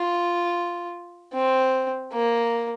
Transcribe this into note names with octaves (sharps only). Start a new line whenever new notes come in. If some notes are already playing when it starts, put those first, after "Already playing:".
Already playing: F4
C4
A#3